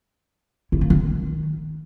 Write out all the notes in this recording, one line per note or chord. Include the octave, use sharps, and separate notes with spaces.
E4
A#3
D#3